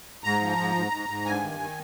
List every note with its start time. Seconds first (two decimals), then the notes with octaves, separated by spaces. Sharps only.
0.24 G#2 A#5
0.41 F3
0.58 G#2
0.75 G#2
0.92 G#2
1.09 G#2
1.26 G2 G#5
1.43 D#3
1.60 D#3